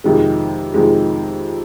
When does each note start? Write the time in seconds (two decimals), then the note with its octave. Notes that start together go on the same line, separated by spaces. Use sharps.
0.04 F2 C3 D#3 G#3
0.74 F2 C3 D#3 G#3